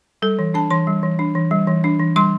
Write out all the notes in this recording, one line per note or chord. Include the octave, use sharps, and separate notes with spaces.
G3 A4
E3
D4 A5
E3 C6
G3
E3
D4
E3
G3
E3
D4
E3
G3 C6